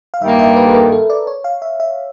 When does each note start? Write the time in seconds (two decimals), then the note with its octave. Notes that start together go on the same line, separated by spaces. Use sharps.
0.14 F5
0.21 G2 D#3 G3 A#3 E5
0.39 E5
0.56 B4
0.67 A4
0.74 A#4
0.92 A4
1.10 D5
1.27 C#5
1.44 F5
1.62 E5
1.80 E5